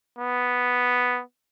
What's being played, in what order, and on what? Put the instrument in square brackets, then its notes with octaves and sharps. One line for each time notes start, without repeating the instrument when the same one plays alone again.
[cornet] B3